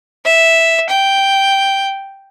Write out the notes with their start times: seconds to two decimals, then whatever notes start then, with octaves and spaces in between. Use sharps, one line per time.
0.25 E5
0.90 G5